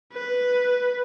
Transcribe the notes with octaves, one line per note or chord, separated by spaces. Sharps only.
B4